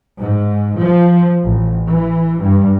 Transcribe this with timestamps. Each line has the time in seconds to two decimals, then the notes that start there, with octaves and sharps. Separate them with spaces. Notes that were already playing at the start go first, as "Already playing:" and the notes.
0.19 G#2
0.82 F3
1.44 A1
1.87 E3
2.40 G2